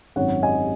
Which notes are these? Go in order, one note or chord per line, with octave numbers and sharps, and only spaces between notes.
G#1 F#2 F#3 C#5 F#5
D#5 G#5